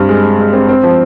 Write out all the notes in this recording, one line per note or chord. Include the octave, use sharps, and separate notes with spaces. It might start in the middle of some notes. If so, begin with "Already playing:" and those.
Already playing: G2 C4
G#3
G#3
G#3
C4
C4
F3